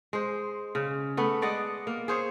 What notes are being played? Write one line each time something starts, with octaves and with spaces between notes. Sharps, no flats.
G#3 C5
C#3
A3 B3
G#3 D5 D#5 F#5
A#3
G#4 C5 C#5